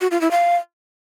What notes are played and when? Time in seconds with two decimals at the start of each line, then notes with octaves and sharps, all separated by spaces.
0.01 F#4
0.11 F4
0.21 E4
0.31 F5